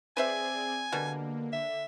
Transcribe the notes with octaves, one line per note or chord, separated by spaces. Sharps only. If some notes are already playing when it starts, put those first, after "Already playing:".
C4 G#4 B4 C5 D5 E5 G#5
B2 D3 G3 A#3
D3 E5